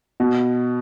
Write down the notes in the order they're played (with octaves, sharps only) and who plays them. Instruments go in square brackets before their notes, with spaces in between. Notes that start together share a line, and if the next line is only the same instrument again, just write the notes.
[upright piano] B2